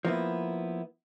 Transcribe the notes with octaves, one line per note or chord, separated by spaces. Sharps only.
F3 A#3 B3 E4